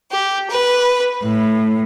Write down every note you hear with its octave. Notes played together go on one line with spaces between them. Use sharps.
G4
B4
A2